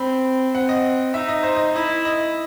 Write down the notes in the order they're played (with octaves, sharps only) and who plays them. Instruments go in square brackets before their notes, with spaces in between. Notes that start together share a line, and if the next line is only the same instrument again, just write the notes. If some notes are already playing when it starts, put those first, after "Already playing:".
Already playing: [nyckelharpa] C4 [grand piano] B5
[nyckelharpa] C4 [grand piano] F#5
[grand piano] D#5
[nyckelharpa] D#4 [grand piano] E5
[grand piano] D#5
C5
D#5
[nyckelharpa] E4 [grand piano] D#5
[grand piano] D#5